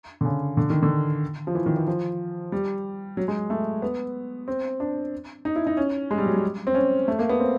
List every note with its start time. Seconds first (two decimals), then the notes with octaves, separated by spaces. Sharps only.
0.21 D3
0.25 C#3
0.57 D3
0.70 D#3
0.83 D3
1.47 F3
1.55 E3
1.66 D#3
1.77 E3
1.88 F3
2.52 G3
3.17 F#3
3.28 G#3
3.50 A3
3.82 B3
4.48 C4
4.80 D4
5.45 D#4
5.56 E4
5.67 D#4
5.77 C#4
6.11 G#3
6.18 G3
6.26 F#3
6.34 G3
6.67 C4
6.74 C#4
7.08 A3
7.19 A#3
7.29 B3
7.40 C4